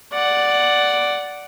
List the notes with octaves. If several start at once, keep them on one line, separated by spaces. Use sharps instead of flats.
D5 F#5